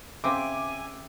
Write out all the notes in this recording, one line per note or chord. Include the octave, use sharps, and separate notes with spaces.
C#3 C4 E5 G#5 D6